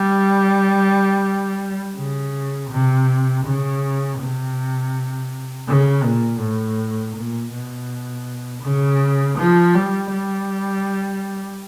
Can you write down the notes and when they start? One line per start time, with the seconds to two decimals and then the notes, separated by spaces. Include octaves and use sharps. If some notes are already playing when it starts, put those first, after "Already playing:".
Already playing: G3
1.96 C#3
2.70 C3
3.45 C#3
4.19 C3
5.67 C#3
6.03 A#2
6.40 A2
7.15 A#2
7.52 B2
8.63 C#3
9.38 F3
9.75 G3
10.12 G3